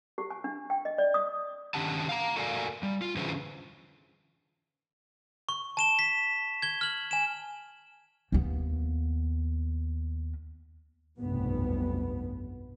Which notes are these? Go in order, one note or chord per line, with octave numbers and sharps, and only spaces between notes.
G4
G#5
D4
G5
D#5
D5
D#6
D3 D#3 C#4 G4 F#5 A5
F5 A#5
F#4 A4 A#4 D5 F5 G#5
G3
F4
D3 E3 C#4 G#4 B4 C5
C#6
A5 E7 G7
B6
G#6 G7
F6 F#7
G#5 E7
D#2 B3
F1 B1 G2 B2 B3